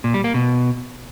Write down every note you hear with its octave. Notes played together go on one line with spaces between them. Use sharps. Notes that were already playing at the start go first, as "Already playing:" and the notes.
A#2
G3
A#3
B2